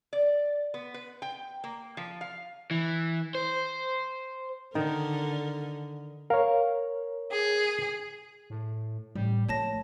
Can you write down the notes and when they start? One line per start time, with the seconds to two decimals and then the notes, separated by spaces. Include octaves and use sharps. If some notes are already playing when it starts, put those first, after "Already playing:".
0.13 D5
0.74 B3
0.94 B4
1.22 G5
1.64 A#3
1.97 F3
2.21 F5
2.71 E3
3.35 C5
4.75 D3 D#3 A#4
6.30 A#4 C#5 F5
7.32 G#4
8.50 A2
9.15 A1 G3
9.49 A#1 A3 E4 C#5 A5 A#6